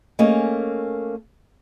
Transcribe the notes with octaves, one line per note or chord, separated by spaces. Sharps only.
A3 A#3 C#4 G#4 D#5